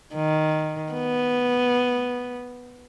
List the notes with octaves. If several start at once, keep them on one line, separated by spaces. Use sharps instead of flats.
D#3
B3